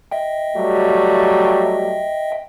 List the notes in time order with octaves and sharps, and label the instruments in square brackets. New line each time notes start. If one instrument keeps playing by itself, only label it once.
[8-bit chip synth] D#5 E5 G5
[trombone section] F#3 G3 A3